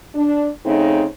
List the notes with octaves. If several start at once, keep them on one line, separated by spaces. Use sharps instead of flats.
D4
C#3 A3 C4 D#4